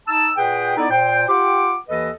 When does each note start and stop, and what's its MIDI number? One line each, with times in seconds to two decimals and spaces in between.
0.08 0.29 63
0.08 0.29 81
0.08 0.29 88
0.36 0.76 46
0.36 0.76 68
0.36 0.76 71
0.36 0.76 78
0.36 0.76 79
0.77 0.85 59
0.77 0.85 63
0.77 0.85 64
0.77 0.85 69
0.77 0.85 74
0.90 1.23 46
0.90 1.23 72
0.90 1.23 79
1.28 1.73 65
1.28 1.73 67
1.28 1.73 78
1.28 1.73 79
1.28 1.73 86
1.89 2.10 39
1.89 2.10 52
1.89 2.10 69
1.89 2.10 71
1.89 2.10 75